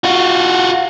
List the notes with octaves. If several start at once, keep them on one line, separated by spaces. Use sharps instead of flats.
F4 F#4